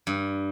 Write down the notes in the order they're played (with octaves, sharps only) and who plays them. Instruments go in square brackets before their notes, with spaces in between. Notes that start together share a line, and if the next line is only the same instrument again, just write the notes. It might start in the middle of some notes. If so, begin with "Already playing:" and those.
[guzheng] G2